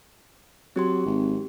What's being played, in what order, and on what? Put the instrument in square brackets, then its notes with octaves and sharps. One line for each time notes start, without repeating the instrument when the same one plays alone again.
[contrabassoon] F#3 [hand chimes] C4 G4 C6
[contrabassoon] G#1